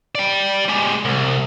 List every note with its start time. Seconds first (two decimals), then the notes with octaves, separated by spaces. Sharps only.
0.15 D5 G5
0.69 G#3 G4
1.05 C2